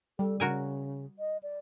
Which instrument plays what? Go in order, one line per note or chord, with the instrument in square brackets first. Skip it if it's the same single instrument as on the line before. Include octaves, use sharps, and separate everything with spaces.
[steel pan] G3 [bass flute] A4
[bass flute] C#3 [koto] F#4 A#4 G#5
[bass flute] D#5
D5